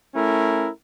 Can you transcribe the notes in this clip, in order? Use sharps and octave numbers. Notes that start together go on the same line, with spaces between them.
A3 C#4 E4 A#4